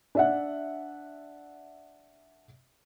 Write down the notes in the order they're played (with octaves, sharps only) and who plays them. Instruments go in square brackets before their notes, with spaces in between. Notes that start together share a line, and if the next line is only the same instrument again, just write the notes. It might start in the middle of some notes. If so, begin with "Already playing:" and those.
[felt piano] D4 E5 F#5